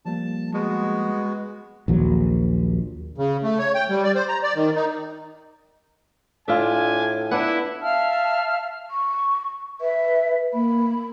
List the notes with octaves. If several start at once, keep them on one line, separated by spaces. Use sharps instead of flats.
F3 G3 A#3 A5
G#3 B3 F#4
A#1 D#2 F#3
C#3
A3
C#5
G5
G3
D5
C5
A#5
D5
D#3
D#4
A2 D4 F4 E5 G#5
B3 D4 E4 F#5
E5 F5 A5 F6
C#6
B4 E5
A#3 B5